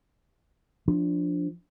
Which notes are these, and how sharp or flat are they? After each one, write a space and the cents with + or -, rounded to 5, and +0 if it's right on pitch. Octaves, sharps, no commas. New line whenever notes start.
F3 +0 D4 +0